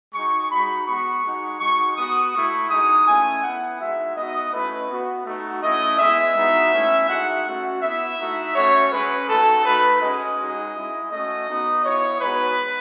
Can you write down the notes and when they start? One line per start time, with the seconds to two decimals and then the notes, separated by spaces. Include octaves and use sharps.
0.14 G#3 D#4 F#4 C#6
0.50 G#3 D#4 F#4 B5
0.87 B3 F#4 C#6
1.24 G#3 D#4 F#4
1.60 G#3 D#4 F#4 C#6
1.97 B3 F#4 D#6
2.34 A3 E4 C#6
2.70 G#3 D#4 F#4 D#6
3.07 A3 C#4 E4 G#5
3.43 B3 E4 F#5
3.80 G#3 D#4 F#4 E5
4.16 B3 D#4 F#4 D#5
4.53 A3 C#4 E4 B4
4.90 B3 F#4
5.26 A3 D#4 F#4
5.63 A3 C#4 E4 D#5
5.99 G#3 B3 E4 E5
6.36 G#3 B3 D#4 F#4
6.72 A3 C#4 E4
7.09 G#3 D#4 F#4 F#5
7.46 A3 C#4 F#4
7.82 B3 E4 E5
8.19 A3 D#4 F#4
8.55 A3 C#4 F#4 C#5
8.92 G#3 C#4 F#4 B4
9.29 A3 D#4 F#4 A4
9.65 A3 D#4 F#4 B4
10.01 G#3 C#4 F#4 D#5
10.38 G#3 D#4 F#4
10.75 G#3 C#4 E4
11.11 A3 C#4 F#4 D#5
11.49 B3 D#4 F#4
11.84 B3 E4 C#5
12.21 G#3 B3 D#4 F#4 B4